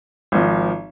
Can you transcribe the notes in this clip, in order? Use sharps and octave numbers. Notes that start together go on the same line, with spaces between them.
G#1 F3